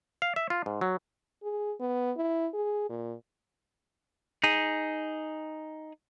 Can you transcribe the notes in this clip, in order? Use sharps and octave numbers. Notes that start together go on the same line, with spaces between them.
F5
E5
F4
G#2
F#3
G#4
B3
E4
G#4
A#2
D#4 G#4